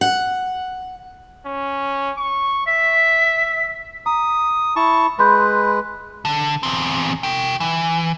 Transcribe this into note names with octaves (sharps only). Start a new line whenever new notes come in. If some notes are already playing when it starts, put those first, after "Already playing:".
F#5
C#4
C#6
E5 B6
A#5 D#6
E4 A5 C#6
G#3 B4 B5 C6 G6
D3
E2 C4
F#4 G5
E3